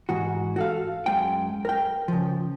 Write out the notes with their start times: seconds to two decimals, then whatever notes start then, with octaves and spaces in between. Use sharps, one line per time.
0.09 G#2 E3 F#4
0.56 F#4 A4 F5
1.06 F#2 G#3 G5
1.65 A#4 G5
2.08 C#3 F3